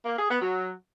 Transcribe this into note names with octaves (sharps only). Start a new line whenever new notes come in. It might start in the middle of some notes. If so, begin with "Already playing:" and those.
A#3
G#4
B3
F#3